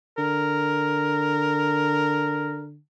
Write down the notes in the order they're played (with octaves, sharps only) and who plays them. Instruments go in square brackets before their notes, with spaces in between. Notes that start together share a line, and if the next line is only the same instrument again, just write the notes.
[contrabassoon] D3 [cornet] A#4